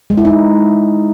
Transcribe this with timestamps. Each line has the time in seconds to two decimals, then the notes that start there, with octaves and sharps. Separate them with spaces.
0.10 G#3
0.17 E4
0.25 D#4